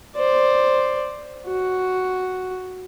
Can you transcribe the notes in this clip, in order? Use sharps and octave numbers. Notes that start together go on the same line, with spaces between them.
C5 D5
F#4